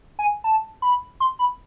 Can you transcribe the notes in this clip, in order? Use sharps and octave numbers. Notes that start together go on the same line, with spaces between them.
G#5
A5
B5
C6
B5